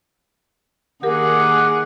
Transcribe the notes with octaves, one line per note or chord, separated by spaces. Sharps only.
D#3 A#3 G4 G#4 A#4 F#5 D6